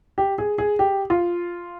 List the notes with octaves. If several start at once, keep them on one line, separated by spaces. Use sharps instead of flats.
G4
G#4
G#4
G4
F4